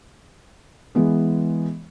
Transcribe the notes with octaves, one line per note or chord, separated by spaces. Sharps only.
E3 G#3 B3